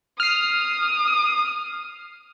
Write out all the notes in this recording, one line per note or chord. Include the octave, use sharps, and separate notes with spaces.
D#6 F6 C7